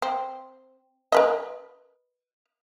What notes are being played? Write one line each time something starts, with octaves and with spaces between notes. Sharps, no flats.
C4
A#4 B4 D#5